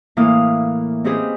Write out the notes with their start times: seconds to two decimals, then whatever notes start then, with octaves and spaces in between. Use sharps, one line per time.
0.17 A2 E3 A#3 F5 D#6
1.04 C4 C#4 D#4 G4 G#4 B4